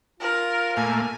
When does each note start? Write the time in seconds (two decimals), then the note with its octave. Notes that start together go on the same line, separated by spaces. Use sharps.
0.20 F4 A#4
0.77 A#2 A3 A#3 G#5